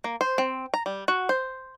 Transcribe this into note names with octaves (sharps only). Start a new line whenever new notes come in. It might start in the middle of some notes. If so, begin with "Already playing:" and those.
A#3
C5
C4
A#5
G3
F#4
C5